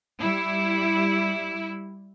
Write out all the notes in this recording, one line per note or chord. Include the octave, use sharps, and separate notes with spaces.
G3 E4